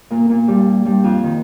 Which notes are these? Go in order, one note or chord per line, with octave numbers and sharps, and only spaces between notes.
A#2 A#3
A#2 A#3
G2 G3
G2 G3
F2 F3
D#3